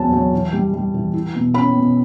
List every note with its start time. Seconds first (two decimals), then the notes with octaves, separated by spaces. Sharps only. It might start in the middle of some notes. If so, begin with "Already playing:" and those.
Already playing: E2 F#3 B3 A5
0.12 F#3
0.33 E3
0.53 G3
0.74 G3
0.94 E3
1.13 E4
1.34 B2
1.54 C#4 B5
1.75 B2